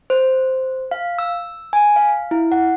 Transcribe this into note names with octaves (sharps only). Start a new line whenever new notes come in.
C5
F5
E6
G#5
F5
E4
F#5